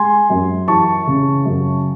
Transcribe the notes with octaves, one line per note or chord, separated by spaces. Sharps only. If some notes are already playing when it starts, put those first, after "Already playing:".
Already playing: G#3 G#5 C6
F#2
E3 A5 C#6
C#3
F#2